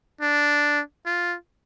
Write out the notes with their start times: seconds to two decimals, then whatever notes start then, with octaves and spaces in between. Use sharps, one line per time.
0.21 D4
1.06 F4